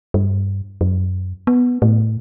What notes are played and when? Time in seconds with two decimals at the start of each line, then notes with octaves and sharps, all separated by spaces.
0.14 G2
0.81 F#2
1.47 B3
1.82 A2